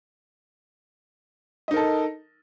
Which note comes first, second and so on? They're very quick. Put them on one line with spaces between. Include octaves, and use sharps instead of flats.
D#5 D#4 A#4 A4